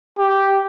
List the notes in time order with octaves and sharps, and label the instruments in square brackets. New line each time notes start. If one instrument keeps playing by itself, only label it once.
[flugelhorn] G4